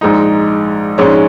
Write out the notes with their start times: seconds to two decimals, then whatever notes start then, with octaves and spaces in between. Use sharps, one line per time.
0.01 A#1 G#2 G#3 D#4
0.98 A#1 G#2 G#3 C#4